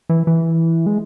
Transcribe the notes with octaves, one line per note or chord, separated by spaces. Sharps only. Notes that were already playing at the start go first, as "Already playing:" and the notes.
E3
E3
G#3